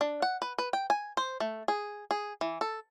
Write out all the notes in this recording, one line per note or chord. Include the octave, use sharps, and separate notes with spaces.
D4
F#5
B4
B4
G5
G#5
C5
A3
G#4
G#4
E3
A4